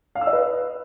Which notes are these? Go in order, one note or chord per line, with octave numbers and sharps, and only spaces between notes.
F5
E6
D#5
B4